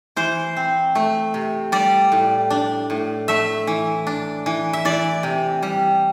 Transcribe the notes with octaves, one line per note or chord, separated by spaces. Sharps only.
E3 C5
C4
A3
C3
G3 D5
A2
D4
A2
A3 E5
E3
D4
E3
E5
E3 D5
C3
G3